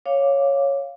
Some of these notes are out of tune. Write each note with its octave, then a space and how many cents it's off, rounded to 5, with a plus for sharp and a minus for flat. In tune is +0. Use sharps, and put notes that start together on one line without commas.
C#5 +0 F5 +0 D6 +0